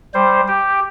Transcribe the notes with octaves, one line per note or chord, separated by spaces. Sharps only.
G3 C5
G4